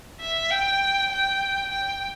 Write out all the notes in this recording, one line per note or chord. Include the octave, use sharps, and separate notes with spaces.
E5
G5
G5
G5